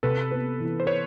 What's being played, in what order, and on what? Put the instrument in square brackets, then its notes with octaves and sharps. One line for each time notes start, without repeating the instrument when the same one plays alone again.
[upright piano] C3 [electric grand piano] A4 B4
[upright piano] B3
E3
[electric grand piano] C5
B4 C#5